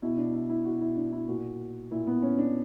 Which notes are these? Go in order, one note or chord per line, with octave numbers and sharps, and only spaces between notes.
B2 E4
D4
E4
E4
B2 F#4
E4
D4
E4
A#2 F#4
A#2 E4
B3
C#4
D4